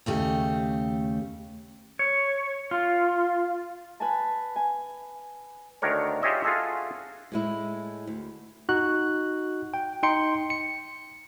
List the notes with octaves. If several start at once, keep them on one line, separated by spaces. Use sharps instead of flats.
D#2 C#3 A3 G4
C#5
F4
B4 G#5 A5
G#5
D2 D#3 D4 A#4 C#5
F4 G4 G#4 C#5 D#5 E5
F4 F#4 G#4 A4 E5
A2 G#3 E4
D2
D#4 F#4 F#6
G5
D#4 G5 C6 C#7
C#7